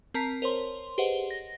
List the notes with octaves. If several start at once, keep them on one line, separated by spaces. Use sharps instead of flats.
C4 A#4 A5 A#5 B6 C7
A#4 C5 C#5 C6
G4 G#4 B4 C5 D#5 F#5
A#6